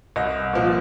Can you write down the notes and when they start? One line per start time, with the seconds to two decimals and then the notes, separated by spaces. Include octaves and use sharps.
0.16 C2 D#5
0.53 A#2 F3